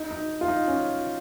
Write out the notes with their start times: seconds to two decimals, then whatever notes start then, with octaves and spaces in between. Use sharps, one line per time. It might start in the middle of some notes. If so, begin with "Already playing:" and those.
Already playing: D#4
0.11 D#4
0.41 F4
0.48 D#4
0.68 C#4